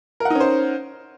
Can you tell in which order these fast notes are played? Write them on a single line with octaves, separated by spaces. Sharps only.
A#4 F#5 D#4 C#4 C5